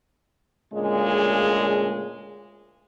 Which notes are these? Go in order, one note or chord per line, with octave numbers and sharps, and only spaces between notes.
D2 A#2 C#3 G#3